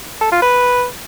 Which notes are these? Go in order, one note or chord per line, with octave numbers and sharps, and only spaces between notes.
A4
F4
B4